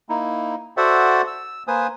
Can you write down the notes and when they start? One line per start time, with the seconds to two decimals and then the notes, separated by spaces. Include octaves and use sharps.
0.09 A#3 D#4 E4
0.77 F#4 A4 C5 D5 E5 F#5
1.27 E6
1.68 A#3 B4 C5 G#5 D#6